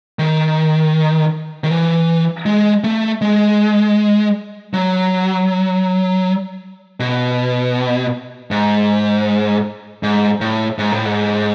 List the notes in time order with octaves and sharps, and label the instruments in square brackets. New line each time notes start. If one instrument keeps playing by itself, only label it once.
[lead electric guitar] D#3
D#3
E3
G#3
A3
G#3
F#3
B2
G#2
G#2
A2
G#2
A2
G#2